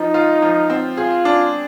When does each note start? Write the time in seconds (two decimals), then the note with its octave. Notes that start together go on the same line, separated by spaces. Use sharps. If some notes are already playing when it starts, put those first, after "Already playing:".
Already playing: F3 D#4
0.14 F4
0.42 F3
0.70 C4
0.97 F4 G#4
1.25 D4